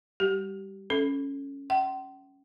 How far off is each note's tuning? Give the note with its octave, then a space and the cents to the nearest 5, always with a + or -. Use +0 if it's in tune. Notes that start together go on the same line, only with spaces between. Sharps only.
G3 +15 G4 -25
C#4 +0 A4 +5
E5 +45 G5 -45 C6 +0